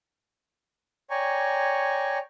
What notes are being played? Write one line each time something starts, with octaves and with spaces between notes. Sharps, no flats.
C#5 D5 G5 G#5 A#5 C#6